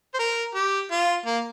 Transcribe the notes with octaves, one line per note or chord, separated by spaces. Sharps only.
C5
A#4
G4
F4
A#3